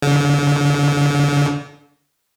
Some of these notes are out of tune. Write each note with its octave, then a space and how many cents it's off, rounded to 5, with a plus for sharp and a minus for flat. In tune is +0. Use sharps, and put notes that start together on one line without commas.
D3 -40